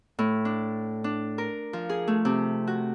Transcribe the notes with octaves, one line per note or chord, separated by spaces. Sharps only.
A2
D4
D4
A#4
F3
G#4
A3
C3
F#4